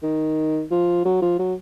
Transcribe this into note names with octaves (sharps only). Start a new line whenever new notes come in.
D#3
F3
F#3
F3
F#3